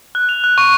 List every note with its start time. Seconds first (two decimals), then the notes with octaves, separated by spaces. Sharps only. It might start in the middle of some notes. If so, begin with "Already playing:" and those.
0.15 F#6
0.29 F7
0.44 F#6
0.58 C#6